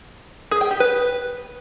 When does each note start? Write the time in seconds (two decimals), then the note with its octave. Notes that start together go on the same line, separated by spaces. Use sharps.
0.51 G#4
0.61 G5
0.71 G4
0.80 B4